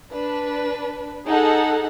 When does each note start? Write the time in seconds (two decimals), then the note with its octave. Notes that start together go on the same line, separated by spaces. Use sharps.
0.12 D4 B4
1.27 D#4 G#4 A4 F#5